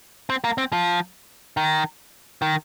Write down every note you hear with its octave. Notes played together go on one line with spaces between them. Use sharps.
C4
A#3
C4
F3
D#3
D#3